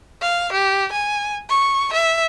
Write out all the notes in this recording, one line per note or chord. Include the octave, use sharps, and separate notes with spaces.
F5
G4
G#5
C#6
E5